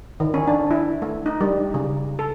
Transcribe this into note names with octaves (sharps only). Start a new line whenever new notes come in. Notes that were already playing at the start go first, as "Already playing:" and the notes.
D#3
C#4
D4
E4
A3
D#4
G3
C#3
A4